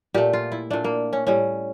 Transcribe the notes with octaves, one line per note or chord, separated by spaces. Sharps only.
A#2 A3 G4
F4
E4
A#2 A3 D4
A#3
C#4
A2 G3 C#4